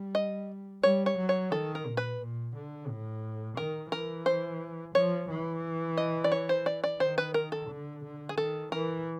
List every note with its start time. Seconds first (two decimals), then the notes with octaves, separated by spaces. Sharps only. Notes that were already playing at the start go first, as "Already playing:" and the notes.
Already playing: G3
0.15 D#5
0.83 G3 C#5
1.06 C#5
1.18 F#3
1.29 C#5
1.52 D#3 A4
1.75 A#4
1.86 A#2
1.97 B4
2.20 A#2
2.55 D3
2.88 A2
3.57 D#3 A#4
3.92 E3 A#4
4.26 C5
4.94 F3 C#5
5.30 E3
5.97 D#5
6.24 D5
6.32 C#5
6.49 C5
6.66 D5
6.84 D5
7.00 D#3 C5
7.18 B4
7.34 A#4
7.52 A4
7.69 D3
8.04 D3
8.29 G#4
8.37 D#3 A4
8.72 E3 A#4